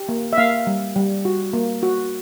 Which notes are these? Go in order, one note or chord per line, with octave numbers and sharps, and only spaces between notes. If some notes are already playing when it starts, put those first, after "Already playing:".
Already playing: G4
A#3
E5
A#3 F5
G3
G3
F#4
A#3
F#4